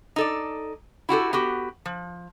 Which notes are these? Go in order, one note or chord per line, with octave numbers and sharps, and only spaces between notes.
D#4 A4 D5
E4 F#4 G4 A4
B3 F#4 G4
F3